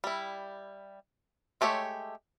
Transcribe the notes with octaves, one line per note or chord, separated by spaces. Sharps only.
G3 E4
G#3 A3 G4 C#5 E5